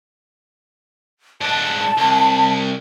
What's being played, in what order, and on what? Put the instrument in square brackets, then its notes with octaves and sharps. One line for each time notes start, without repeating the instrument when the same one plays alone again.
[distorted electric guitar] G#2 D4 [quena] A5
[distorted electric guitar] C2